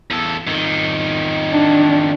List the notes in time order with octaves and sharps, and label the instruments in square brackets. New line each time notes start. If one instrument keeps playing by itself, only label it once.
[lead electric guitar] E2 A4
F2 D#3
[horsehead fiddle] D4